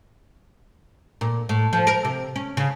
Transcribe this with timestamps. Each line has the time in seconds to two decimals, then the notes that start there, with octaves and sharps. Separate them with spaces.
1.21 A#2
1.49 A2
1.73 F3
1.87 A#4
2.05 C3
2.36 C#4
2.57 C#3